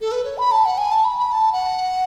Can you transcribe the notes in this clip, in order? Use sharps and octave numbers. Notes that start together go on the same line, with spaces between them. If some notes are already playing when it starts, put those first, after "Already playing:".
A4
B4
C#5
B5
A5
F#5
G#5
A5
B5
B5
A5
F#5